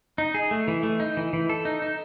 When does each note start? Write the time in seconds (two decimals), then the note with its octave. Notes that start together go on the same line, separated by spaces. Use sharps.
0.18 D#4
0.35 G#4
0.51 A3
0.68 E3
0.83 A3
1.00 D#4
1.17 E3
1.33 E3
1.49 A4
1.65 D#4
1.82 D#4